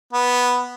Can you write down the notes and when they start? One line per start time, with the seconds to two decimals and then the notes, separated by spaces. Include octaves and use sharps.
0.13 B3